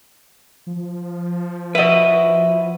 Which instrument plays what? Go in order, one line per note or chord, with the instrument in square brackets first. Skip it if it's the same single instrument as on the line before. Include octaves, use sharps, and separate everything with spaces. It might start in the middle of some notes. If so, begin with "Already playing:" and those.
[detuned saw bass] F3
[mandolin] E4 F#4 [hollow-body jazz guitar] B4 D#5